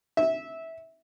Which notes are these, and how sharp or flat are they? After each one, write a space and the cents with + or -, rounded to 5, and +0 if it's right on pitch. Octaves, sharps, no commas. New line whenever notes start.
E5 -15